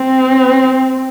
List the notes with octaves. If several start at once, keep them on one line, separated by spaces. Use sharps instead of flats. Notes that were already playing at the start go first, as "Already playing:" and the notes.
Already playing: C4